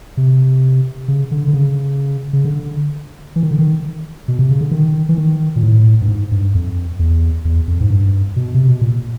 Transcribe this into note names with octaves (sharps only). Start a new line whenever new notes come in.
C3
C#3
D3
D3
C#3
C#3
D3
E3
D#3
D3
D#3
B2
C3
C#3
D3
D#3
E3
D#3
A#2
A2
G2
G#2
G2
F2
E2
E2
F2
G#2
G2
B2
C3
B2
A#2